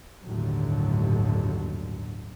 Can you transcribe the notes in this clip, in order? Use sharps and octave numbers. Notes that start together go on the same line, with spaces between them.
G1 D#2 A2 D3 F#3